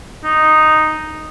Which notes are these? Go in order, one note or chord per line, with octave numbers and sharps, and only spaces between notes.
D#4